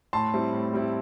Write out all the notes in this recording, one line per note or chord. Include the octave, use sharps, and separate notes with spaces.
A2 A5 C6
G3 C4 E4
A2
G3 C4 E4